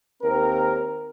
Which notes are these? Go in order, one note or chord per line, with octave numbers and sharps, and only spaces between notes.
D#2 C4 A#4